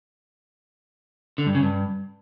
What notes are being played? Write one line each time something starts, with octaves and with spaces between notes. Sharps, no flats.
D3
G2
C#3
G2